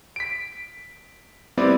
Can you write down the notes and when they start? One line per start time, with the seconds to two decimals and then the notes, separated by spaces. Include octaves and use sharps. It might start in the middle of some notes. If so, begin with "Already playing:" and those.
0.16 B6 D7
1.57 G3 B3 C4 E4 D5